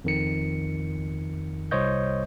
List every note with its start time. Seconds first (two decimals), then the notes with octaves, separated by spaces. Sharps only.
0.04 F2 D#3 C#7
1.71 C2 C5 C#5 D#5 G6